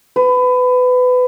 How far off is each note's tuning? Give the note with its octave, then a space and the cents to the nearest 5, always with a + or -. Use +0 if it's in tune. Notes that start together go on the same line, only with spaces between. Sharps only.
B4 +25